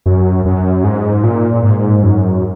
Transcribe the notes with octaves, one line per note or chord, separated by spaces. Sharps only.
F#2
F#2
G#2
A#2
G#2
F#2